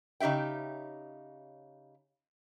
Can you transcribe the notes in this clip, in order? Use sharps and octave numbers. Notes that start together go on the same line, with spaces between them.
C#3 D#4 G4 E5 G5